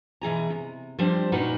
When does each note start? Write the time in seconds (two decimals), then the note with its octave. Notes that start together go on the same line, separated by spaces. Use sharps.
0.21 B2 E3 G#4 A#5
0.50 C3
0.99 F3 G3 C4 D4 C5
1.32 A#2 C#4 D#4 F#4 A#4 B4